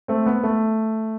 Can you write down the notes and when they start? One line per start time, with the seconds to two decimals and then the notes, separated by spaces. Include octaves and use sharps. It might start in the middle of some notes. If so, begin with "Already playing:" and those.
0.08 A3 C4
0.26 B3
0.44 A3